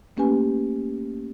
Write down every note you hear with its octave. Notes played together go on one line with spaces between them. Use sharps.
A3 A#3 C#4 G4 B4 G#5